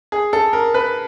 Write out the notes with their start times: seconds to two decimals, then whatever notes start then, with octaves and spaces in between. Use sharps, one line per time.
0.12 G#4
0.33 A4
0.53 A#4
0.74 B4